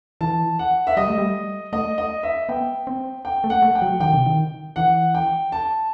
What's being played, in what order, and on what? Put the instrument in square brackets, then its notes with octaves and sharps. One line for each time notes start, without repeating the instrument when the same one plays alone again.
[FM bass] E3 [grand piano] A5
[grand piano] F#5
E5
[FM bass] G3 [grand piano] D#5
[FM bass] A3
G3
[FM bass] A3 [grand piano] D#5
[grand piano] D#5
E5
[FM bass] B3 [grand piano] G5
[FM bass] C4
[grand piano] G5
[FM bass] A3
[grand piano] F#5
[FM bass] A3
[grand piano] G5
[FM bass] F#3
[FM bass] D#3 [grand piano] G5
[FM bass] C3
D#3
[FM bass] E3 [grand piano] F#5
[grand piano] G5
A5